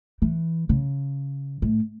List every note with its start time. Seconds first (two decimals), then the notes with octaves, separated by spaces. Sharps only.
0.22 E3
0.69 C#3
1.62 A2